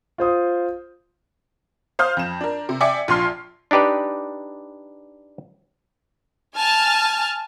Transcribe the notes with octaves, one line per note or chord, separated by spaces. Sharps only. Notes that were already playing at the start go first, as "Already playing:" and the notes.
F4 C5 D#6
C5 F5 D#6 F6 G6
F2 E7
D4 A#4
C3
D5 E5 G5 G#5 D6 C#7
A#1 F4 A5 C6 F6 C7
D4 D#4 G4 B4 D5
G#5 A5 F6